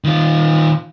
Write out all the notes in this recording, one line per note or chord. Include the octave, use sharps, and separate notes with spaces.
D#3 F4